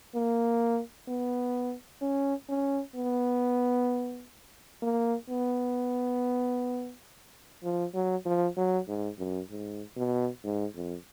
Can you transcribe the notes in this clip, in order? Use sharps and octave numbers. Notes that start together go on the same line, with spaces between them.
A#3
B3
C#4
C#4
B3
A#3
B3
F3
F#3
F3
F#3
G#2
F#2
G#2
B2
G#2
F2